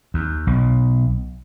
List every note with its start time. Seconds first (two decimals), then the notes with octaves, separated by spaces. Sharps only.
0.14 D#2
0.47 B1